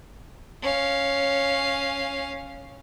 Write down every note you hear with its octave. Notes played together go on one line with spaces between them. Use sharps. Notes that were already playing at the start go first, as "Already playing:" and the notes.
C#4 F5